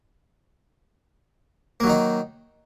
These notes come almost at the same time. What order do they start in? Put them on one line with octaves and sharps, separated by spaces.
A#3 F#3 D#3 D#4